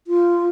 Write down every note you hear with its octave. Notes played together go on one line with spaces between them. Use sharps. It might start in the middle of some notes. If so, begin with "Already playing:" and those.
F4